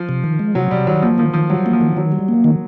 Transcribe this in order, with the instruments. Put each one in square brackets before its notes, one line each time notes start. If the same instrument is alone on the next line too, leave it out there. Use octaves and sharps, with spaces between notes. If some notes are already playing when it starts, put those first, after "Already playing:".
Already playing: [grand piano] F3
[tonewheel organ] C3
D#3
G#3
[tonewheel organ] C3 [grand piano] F#3
[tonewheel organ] C3 [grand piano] G3
[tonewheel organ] D#3 [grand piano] F#3
[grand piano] F3 [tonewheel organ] A#3
[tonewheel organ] D#3 [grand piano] F3
[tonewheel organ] D#3 [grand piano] F3
[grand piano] F#3 [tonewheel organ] G3
[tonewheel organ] A#3
[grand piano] F3
[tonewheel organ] D#3
[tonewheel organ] D#3 [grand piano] F#3
[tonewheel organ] G3
A#3
D#3